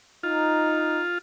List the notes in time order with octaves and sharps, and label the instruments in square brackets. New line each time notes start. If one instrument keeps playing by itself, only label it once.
[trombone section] D#4 [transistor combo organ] F4